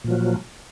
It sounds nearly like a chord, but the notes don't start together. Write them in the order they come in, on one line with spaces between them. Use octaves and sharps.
A#2 F3 F#3